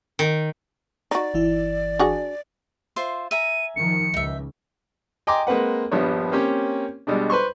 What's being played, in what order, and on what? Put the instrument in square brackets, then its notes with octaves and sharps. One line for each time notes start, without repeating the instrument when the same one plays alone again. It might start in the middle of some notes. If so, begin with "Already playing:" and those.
[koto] D#3
[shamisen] D#4 F#4 [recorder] D5
[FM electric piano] G1 E3 E4
[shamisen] D4 F#4 G#4
[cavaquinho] F4 C5 E5
[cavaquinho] E5 G#5 A#5 [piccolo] D#7
[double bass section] D#3 F3 [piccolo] C#7
[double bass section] C#2 [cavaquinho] D#4 E5
[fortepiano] D#5 G5 G#5 A#5 C6 D6
G#3 A#3 C4 B4 F#5
A#1 G2 F3 G3 B3 C#5
A#3 C4 C#4 G4 C#5
B2 G3 G#3 D4
B4 C5 C6 C#6